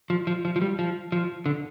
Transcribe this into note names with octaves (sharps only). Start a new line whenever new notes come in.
F3
F3
F3
F3
G3
F3
F3
D3